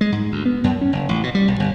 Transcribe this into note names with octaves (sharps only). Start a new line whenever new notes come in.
G#3
G#2
D2
B3
F#2
C#4
F#1
A1
B2
G3
B1
G1